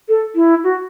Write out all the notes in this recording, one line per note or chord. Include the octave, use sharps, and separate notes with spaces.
A4
E4
F#4